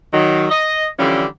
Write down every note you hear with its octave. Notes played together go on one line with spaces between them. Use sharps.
D#3 F#3
D#5
D3 E3 F3 G3 C#4 G4